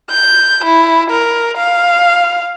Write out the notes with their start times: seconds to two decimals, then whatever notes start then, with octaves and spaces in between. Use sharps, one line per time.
0.10 G6
0.65 E4
1.10 A#4
1.58 F5